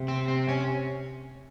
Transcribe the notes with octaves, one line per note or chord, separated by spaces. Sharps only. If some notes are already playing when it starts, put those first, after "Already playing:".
Already playing: C3
C4
C4
C#4